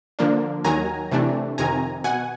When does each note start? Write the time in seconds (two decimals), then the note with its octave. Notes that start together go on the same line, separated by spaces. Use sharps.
0.19 D3 F3 A#3 D4
0.64 D#2 D#3 F#3 G#5 A#5
1.12 C3 E3 A3 D4
1.58 F2 C3 D#3 G#5 A#5
2.04 B2 F#5 G#5